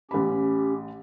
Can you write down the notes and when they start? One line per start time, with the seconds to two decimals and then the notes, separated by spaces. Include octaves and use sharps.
0.11 A1 C#4 G4 B5